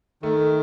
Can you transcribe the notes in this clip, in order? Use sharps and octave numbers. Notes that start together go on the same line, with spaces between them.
D#3 A3